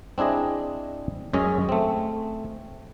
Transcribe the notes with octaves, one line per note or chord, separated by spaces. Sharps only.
C4 D4 E4 G#4 D#5
F#2 G#3 C#4 G#4 D#5
A3 C4